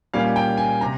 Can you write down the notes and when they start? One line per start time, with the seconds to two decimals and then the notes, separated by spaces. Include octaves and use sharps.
0.14 A#2 G3 A#3 C#4 F5
0.36 G5
0.58 G#5
0.81 C3 A#5